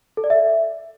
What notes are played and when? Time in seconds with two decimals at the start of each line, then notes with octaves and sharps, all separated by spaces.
0.17 A4
0.24 D5
0.30 E5